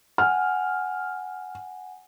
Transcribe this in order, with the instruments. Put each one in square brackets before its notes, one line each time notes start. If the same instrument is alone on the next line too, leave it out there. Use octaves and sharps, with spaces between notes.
[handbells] F#5 G#5 [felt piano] F6